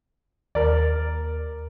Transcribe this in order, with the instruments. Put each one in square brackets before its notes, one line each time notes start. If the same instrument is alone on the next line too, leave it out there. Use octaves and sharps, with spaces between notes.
[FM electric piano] D#2 [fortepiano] A#4 D5